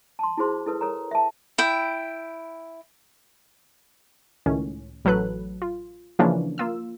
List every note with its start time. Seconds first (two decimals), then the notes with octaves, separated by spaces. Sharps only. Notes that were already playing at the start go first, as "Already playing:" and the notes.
0.19 A5 C6
0.38 E4 F#4 G#4 C5 C6
0.66 E4 A4 B4
0.81 A4 A#4 C#5 A#5
1.11 E5 A5
1.58 E4 G5
4.46 C#2 A2 D#3 C#4
5.05 A1 F#3 A4 B4 F#6
5.62 F4
6.19 C#3 E3 F3 A#3 C#4 D4
6.58 A#3 F4 E6